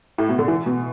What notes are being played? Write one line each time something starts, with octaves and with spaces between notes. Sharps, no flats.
A2
B2
D3
E3
B2